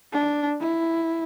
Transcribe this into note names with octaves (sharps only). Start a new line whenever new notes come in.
D4
E4